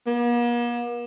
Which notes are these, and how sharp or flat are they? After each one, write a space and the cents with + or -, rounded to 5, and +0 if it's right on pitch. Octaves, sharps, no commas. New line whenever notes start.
A#3 +45